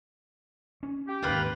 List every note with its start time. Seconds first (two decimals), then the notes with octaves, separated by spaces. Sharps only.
0.83 C#4
1.07 G4
1.23 G#1 D#2 C#4 F4 A#4 B4